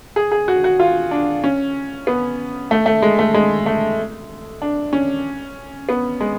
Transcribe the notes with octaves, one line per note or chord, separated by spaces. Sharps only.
G#4
G#4
F#4
F#4
F4
D4
C#4
B3
A3
A3
G#3
A3
G#3
A3
D4
C#4
B3
G#3